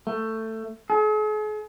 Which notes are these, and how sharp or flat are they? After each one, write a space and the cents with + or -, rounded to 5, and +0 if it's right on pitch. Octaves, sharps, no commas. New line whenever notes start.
A3 +15
G#4 +45